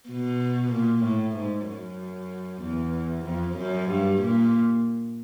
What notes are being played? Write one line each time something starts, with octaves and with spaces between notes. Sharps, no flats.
B2
A#2
A2
G#2
F#2
E2
F2
F#2
G2
A#2